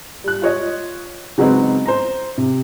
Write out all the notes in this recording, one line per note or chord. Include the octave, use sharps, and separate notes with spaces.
G3 F#6
F4 C#5 D#5
C#3 F#3 G#3 B3 C4 D#4
C5 A#5
C3